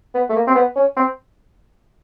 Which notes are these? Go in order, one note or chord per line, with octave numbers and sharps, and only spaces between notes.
B3
A3
A#3
C4
B3
C#4
C4